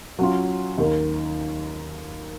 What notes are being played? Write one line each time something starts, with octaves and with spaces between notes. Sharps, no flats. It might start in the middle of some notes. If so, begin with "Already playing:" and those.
F#3 C#4 F4
D#2 D#3 A#3 D#4